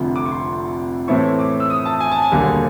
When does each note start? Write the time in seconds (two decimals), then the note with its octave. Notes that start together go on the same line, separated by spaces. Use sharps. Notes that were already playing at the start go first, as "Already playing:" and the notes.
Already playing: F1 F2 D3
0.16 D6
0.25 C#6
0.31 C6
1.08 A2 E3 A3 C4 E4 C#6
1.39 D6
1.60 E6
1.70 D#6
1.86 A5
2.00 G#5
2.11 A5
2.22 G#5
2.31 E1 D#2 D3 G3 A#3